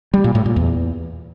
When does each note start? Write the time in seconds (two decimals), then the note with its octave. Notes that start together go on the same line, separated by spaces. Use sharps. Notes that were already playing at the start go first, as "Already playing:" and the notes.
0.14 G3
0.24 A#2
0.35 A2
0.46 A#2
0.56 E2